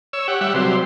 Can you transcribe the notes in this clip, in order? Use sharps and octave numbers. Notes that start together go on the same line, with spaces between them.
C#5 E6
G4 F#5
G3 E5 F#5
C3 F#3 G3 C5